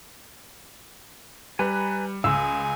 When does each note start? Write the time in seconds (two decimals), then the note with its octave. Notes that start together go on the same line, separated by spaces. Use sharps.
1.59 G3 B4 G#5 A#5 B5
2.24 C#2 F5 G#5 C6 D#6 E6